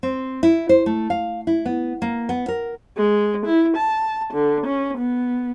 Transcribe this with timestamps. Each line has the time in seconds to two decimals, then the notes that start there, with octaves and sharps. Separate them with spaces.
0.03 C4
0.43 E4
0.69 C5
0.86 A3
1.10 F5
1.47 E4
1.65 B3
2.02 A#3
2.29 B3
2.48 A#4
2.97 G#3
3.46 E4
3.76 A5
4.33 D3
4.66 C#4
4.97 B3